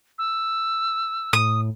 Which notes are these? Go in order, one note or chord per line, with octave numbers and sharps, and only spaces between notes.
E6
A2 D#6